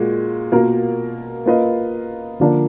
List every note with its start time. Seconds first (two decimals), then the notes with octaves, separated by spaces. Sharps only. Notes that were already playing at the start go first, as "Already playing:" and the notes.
Already playing: A#2 G#3 F#4
0.52 B2 A#3 F4 A#4
1.46 A#3 F4 B4 D#5
2.40 D3 F3 A#3 D4 F4